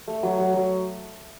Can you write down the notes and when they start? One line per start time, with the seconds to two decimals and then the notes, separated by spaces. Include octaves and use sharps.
0.08 A3
0.23 F#3
0.38 F#3
0.54 F#3